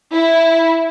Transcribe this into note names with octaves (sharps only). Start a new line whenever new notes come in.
E4